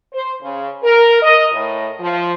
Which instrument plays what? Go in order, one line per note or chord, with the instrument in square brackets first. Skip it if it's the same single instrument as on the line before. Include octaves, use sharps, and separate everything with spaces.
[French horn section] C5
C#3
A#4
D#5
A2
F3